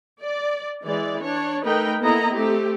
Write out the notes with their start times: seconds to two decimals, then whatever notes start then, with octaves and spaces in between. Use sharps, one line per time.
0.20 D5
0.84 E3 G#3 D5
1.23 D4 C#5
1.65 A3 D#4 A#4 B4 G5
2.01 A#3 B3 E4 A4 D#5 A#5
2.31 A3 C4 G4